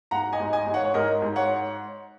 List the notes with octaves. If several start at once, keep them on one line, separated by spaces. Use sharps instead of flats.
G#2 F#5 A#5
D#5 G#5
G#2
D#5 G#5
G#2
C#5 F#5
C#5
G#2 A#4 D#5
G#2
C#5 F#5